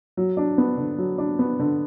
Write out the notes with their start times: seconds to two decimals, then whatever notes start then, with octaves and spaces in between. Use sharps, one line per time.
0.17 F#3
0.37 D4
0.58 B3
0.77 D3
0.98 F#3
1.18 D4
1.39 B3
1.59 D3